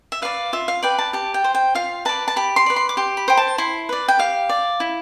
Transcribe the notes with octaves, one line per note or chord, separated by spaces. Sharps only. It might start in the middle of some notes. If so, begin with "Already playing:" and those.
E5
B4 D5 F5
F4 E5
F5
B4 D5 G5
A5
G4 A5
G5
C5
G5
F4 F5
B4 D5 A5
A5
G4 B5
C6
B4 D5
C6
D6
G4 C6
B5
C5 G5
A5
E4 C6
B4 D5
G5
G4 F5
D5
E4